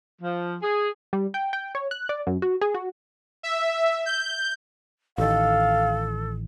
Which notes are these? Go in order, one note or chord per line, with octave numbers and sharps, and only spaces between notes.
F3
G#4
G3
G5
G5
C#5
F#6
D5
F#2
F#4
G#4
F#4
E5
G6
A1 D#3 A4 F5